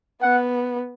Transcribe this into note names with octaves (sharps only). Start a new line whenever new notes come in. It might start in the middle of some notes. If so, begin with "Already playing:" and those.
B3 F#5